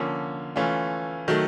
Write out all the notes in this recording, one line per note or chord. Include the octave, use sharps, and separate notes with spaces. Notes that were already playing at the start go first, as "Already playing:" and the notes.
Already playing: D3 F3 A#3 C#4
E3 A3 C#4 F4
D#3 F#3 A3